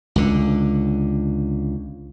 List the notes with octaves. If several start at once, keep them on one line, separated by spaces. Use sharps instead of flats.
C#2 D3